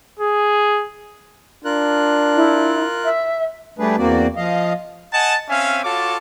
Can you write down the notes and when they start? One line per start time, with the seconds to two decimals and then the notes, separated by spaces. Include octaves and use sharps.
0.19 G#4
1.65 D4 F4 A#4 F#6
2.35 E4
3.04 E5
3.79 G3 A3 D4 G#4 B4
3.98 E2 A#3 C4 F#4 D5
4.37 F3 D#5 F5
5.13 D#5 F#5 G#5 A5
5.49 C4 C#4 E5 F5 G#5
5.84 F4 F#4 A4 C#5 A5 D6